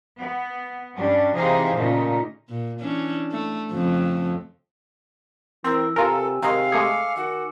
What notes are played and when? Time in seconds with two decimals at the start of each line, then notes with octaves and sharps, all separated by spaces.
0.18 B3
0.95 G2 G3 C#4 D4
1.35 C3 E3 D#4 G#4 C5 F5
1.75 A#2 C#3 A3 D#4
2.49 A#2
2.80 E3 C#4 D4
3.32 A3
3.71 F2 C#3 A3
5.64 E3 C4 A#4 E6
5.96 C3 F4 A4 A#4 G#5
6.42 C3 D#3 G#3 F5
6.72 G#3 A3 G#4 D6 C#7
7.16 D#3 F#4